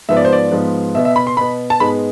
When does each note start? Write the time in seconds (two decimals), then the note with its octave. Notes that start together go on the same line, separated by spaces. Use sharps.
0.09 G#2 F3 B3 E5
0.17 D5
0.25 C5
0.33 D5
0.51 G#2 F3 B3
0.95 B2 B3 E5
1.05 E5
1.16 B5
1.27 C6
1.37 B2 B3 B5
1.70 A5
1.80 G#2 G#3 B3 B5